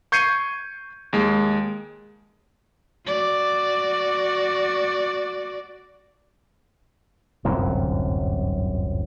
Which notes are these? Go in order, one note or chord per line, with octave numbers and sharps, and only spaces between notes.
C#6 G6 G#6 C7 C#7 D#7
D#2 G#3
F#4 D5
D1 G1 F#2 C3